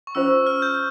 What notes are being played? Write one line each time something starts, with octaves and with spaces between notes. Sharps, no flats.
C#6
C#4 F4 C5 E6
F6
G6